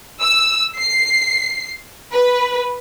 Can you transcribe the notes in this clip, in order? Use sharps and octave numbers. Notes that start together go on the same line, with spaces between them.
E6
C7
B4